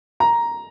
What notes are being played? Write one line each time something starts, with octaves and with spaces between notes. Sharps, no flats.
A#5